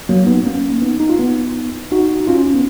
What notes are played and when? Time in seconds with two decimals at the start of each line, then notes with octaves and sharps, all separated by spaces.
0.09 F#3 A#3
0.26 B3 D#4
0.45 A#3 C#4
0.82 B3 D#4
1.00 D#4
1.10 F4
1.19 B3 D#4
1.92 D#4 F#4
2.20 D#4
2.27 C#4 F4
2.47 C#4
2.54 B3